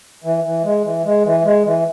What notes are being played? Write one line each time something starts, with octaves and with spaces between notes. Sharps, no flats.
E3
E3
G#3
E3
G#3
E3
G#3
E3